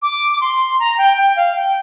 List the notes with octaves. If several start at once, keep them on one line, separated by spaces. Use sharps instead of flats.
D6
C6
A#5
G5
G5
F5
G5